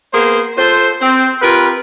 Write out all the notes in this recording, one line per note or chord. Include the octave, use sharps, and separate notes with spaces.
A#3 B3 G#4 A#4 C5
F4 A4 C5
C4
F4 G4 A#4 B4